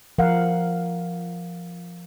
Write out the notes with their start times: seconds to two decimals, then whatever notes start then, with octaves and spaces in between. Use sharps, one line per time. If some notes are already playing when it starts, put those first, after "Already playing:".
0.18 F3 A#4 F5 F#5